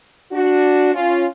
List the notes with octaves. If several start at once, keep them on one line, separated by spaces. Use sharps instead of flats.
D4 F#4
C#4 F4